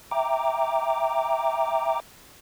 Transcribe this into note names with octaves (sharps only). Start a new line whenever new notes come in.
E5 G5 A#5 D6